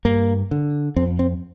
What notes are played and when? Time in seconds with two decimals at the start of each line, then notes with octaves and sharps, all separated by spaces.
0.05 G2 A#3
0.51 D3
0.96 F2 C4
1.19 C4